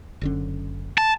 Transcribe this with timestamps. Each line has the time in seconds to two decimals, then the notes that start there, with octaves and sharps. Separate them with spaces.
0.21 F#1 D3 C#4
0.98 A5